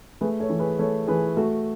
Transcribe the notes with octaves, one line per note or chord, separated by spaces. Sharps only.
A3 G#4 B4
A4 C#5
E3
G#4 B4
A3 A4 C#5
E3 G#4 B4
A3 F#4 A4